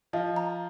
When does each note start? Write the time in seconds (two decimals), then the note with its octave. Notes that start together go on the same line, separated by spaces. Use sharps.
0.13 F3 F4 D#5
0.36 A#5